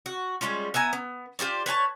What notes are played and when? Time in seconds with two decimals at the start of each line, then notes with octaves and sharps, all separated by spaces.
0.06 F#4
0.41 G3 G#3 C#4 F4
0.74 B3 E5 G#5 A#5
0.93 B3
1.39 F4 G4 C5 D5
1.66 B4 C#5 G#5 A5